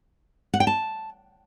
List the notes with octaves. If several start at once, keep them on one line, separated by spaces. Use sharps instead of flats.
F#5
G5
A5